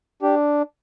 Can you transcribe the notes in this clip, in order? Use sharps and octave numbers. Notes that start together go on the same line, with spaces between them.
D4 G4